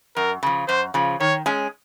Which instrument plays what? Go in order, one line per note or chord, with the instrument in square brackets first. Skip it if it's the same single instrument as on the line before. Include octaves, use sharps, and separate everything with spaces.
[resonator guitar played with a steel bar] F#2 [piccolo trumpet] A#4
[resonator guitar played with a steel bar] C#3 F3
[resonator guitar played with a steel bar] F#2 [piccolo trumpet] C5
[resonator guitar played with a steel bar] C#3 F3
[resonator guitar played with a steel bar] D#3 [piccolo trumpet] C#5
[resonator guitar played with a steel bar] G#3 C#4 G#4